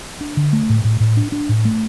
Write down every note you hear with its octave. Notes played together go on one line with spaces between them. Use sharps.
D4
D3
A3
A2
A2
A2
D4
D4
A2
A3